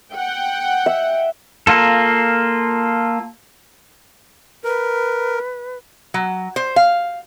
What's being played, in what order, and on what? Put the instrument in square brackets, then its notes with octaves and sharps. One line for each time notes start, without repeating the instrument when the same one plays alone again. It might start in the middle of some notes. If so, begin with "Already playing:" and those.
[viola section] F#5 G5
[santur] E5
[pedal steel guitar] A#3 F4 A4
[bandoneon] A#4 [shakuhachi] B4
[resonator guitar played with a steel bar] F#3
C5
F5